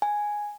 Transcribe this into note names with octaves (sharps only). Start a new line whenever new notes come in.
G#5